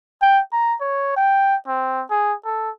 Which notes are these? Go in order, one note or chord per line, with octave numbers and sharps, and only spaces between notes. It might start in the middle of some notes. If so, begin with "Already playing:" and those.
G5
A#5
C#5
G5
C4
G#4
A4